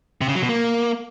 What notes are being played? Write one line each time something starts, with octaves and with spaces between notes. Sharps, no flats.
C3
C#3
F#3
B2
A#3